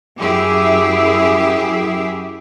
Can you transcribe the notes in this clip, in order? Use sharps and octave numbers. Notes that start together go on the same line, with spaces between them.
F#2 E4 G4 G#4 E5